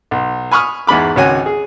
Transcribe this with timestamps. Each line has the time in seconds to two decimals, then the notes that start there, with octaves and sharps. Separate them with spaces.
0.11 B1
0.51 G#5 B5 C#6 D#6 F6
0.87 E2 G#2 G#3 B5 D6
1.16 G#1 C#2 F#4 C#5 F#5 G#5
1.46 G#4